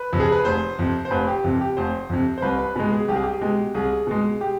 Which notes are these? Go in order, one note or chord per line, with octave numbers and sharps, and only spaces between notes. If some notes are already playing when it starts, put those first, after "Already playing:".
Already playing: B4
F2 C3
G#4
B4
F1 C5
F2 C3
C5
F1 B4
G4
F2 C3
G4
F1 C5
F2 C3
C5
C2 B4
B4
B2 G#3 B4
G#4
C2 G4
G#4
G4
B2 G#3
C2 G#4
B2 G#3
G4